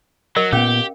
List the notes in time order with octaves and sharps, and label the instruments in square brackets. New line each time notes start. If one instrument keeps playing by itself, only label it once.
[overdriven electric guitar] F#3 [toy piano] A#4 D#5
[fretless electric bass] A#2 B3 [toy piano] C#4 F5 G5 [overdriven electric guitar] G4